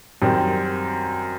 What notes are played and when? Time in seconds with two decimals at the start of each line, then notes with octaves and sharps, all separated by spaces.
0.22 F#2 D#3 G3 C4